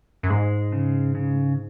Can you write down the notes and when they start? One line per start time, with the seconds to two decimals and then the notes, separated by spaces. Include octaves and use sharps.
0.23 F#2
0.30 G#2 G#3
0.72 C#3
1.15 C#3